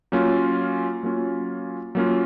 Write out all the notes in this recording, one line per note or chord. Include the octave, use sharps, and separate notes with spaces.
F#3 A#3 C#4 F4
F#3 A#3 C#4 F4
F#3 A#3 C#4 F4